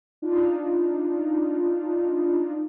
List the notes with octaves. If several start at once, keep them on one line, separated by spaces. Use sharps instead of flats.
D4 D#4 F4